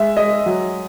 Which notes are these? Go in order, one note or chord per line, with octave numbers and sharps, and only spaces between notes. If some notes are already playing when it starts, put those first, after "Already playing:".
Already playing: G#3 E5
G#3 D#5
F#3